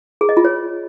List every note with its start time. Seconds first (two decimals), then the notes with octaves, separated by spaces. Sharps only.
0.21 G#4
0.29 D#5
0.37 F4
0.45 C#5